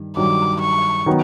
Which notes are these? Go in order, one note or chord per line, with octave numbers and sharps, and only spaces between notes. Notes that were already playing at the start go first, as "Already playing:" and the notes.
Already playing: G2 D#3
G2 D#3 F#3 D6
C#6
D#3 F#3 B3